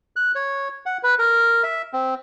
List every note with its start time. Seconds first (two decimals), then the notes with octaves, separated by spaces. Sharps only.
0.16 F#6
0.35 C#5
0.86 F#5
1.03 B4
1.19 A#4
1.63 E5
1.93 C4